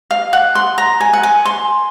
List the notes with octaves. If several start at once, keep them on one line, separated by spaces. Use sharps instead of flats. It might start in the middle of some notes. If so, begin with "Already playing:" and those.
F5
F#5
C6
A#5
G#5
F#5
G#5
C6